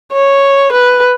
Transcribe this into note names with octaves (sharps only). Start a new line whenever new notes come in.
C#5
B4